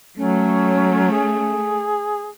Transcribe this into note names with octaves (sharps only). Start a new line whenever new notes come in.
F#3 A3 C#4
G#4